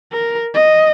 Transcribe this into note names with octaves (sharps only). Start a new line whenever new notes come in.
A#4
D#5